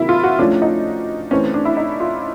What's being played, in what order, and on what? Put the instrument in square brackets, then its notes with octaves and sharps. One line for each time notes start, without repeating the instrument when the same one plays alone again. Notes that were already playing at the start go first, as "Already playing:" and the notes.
Already playing: [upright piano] C3 D#3 F#3 A#3 [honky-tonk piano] E4
[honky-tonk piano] F4
F#4
[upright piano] F3 A3 C#4 F4 [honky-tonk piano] D4
[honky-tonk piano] D#4
[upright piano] E3 A3 C4 [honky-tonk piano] C#4
[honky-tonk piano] D4
E4
D#4
F4